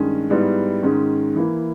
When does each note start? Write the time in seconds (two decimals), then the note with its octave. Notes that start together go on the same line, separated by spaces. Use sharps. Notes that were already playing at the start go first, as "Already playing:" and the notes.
Already playing: G2 D#3 G#3 C#4
0.30 G#2 G3 B3 E4
0.83 G#2 D#3 G#3 C#4
1.36 E3 A#3 E4